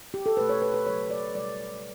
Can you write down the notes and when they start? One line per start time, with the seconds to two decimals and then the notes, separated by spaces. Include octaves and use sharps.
0.14 G4
0.26 A4
0.37 B2 A3 B4
0.49 C#5
0.62 B4
0.74 B4
0.86 C#3 F#3 A3 C#5
1.10 D5
1.35 B2 G3 D5